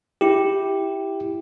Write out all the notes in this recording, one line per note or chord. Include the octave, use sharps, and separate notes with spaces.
E4 G4